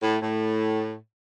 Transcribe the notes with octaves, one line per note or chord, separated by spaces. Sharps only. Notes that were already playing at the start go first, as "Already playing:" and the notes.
A2
A2